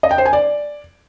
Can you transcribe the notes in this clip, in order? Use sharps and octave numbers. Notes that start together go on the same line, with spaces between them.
D#5
G5
C5
G#5
D5